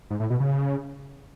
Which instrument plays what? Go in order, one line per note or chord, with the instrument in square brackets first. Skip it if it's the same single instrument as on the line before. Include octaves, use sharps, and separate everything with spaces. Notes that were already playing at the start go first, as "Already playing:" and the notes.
[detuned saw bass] G#2
A2
B2
C#3